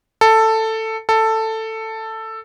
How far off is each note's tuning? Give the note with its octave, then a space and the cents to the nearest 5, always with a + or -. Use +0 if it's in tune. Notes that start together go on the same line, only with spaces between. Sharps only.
A4 +10
A4 +10